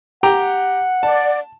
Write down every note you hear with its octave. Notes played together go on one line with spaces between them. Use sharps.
G4 F#5 G5 A#5
D5 A5